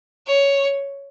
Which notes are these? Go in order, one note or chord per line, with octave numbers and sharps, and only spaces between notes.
C#5